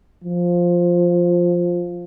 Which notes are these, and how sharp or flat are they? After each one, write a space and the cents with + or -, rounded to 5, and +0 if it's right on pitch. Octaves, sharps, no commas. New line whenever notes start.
F3 +5